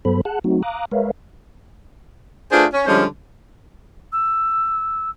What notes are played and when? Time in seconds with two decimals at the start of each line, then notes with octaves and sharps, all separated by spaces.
0.05 G2 F#3 B3 A4 C5 B5
0.25 G#4 F#5 A5 F#6
0.44 F#3 A3 C4 D#4 F#4
0.63 F5 A#5 D6 D#6 F#6
0.92 G#3 A#4 B4 C#5 E5 F5
2.52 A3 D4 F4 G#4 B4 C5
2.74 C#4
2.87 D3 F3 G3 G#3 C#4 C5
4.12 E6